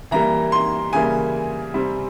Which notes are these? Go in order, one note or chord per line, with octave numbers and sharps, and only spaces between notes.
E3 G3 A#3 A#5
C6
C#3 E3 G3 A#3 G#5
C3 G3 C4